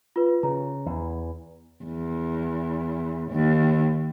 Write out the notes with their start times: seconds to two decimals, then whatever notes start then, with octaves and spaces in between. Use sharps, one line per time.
0.16 F4 B4
0.43 C#3 A#5
0.86 E2 E3
1.85 E2
3.31 D#2